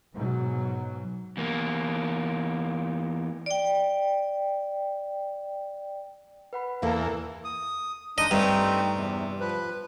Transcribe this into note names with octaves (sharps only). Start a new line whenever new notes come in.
G#2 B2 F#3
E2 A#3
D5 G5
B4 F#5 B5
E2 A#3 B3 A4 A#4
D#6
G#3 D4 D#4 D#5
G2 A3 C4 D#4
E2 C3
F3 B4